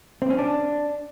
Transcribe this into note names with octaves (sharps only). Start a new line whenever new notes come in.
C4
C#4
D4